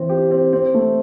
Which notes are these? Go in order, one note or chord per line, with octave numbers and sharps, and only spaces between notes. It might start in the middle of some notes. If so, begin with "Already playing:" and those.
Already playing: E3 C4
G4
C4
C4
A3